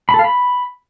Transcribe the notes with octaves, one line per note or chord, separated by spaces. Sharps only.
B5
A4
F5
B5